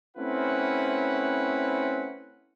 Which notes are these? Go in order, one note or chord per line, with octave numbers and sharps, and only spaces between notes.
A3 C4 C#4 E4 B4 F#5